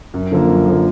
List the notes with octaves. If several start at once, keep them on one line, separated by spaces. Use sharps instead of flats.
F#2
D3 F3 A#3
F#2
D3 F3 A#3